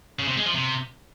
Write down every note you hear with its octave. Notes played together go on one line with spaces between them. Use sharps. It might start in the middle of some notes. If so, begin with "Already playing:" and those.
C#3
C3
G#3
F3
C3